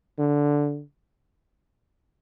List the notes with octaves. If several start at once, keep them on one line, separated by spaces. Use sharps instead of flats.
D3